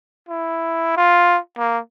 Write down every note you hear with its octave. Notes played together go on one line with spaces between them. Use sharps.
E4
F4
A#3